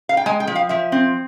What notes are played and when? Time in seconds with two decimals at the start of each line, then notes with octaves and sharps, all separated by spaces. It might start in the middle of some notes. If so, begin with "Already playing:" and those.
0.09 F5
0.17 G5
0.26 G#3 G#5
0.40 G5
0.47 F3
0.55 F5
0.69 F3 E5
0.92 C4